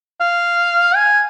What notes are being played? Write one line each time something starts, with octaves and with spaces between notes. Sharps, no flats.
F5
G#5